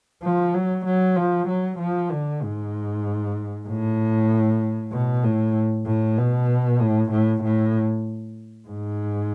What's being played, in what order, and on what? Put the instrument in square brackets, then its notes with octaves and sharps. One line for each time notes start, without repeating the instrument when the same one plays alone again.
[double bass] F3
F#3
F#3
F3
F#3
F3
D3
G#2
A2
B2
A2
A2
B2
A2
A2
A2
G#2